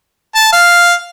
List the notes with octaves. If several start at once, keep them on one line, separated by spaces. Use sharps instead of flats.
A5
F5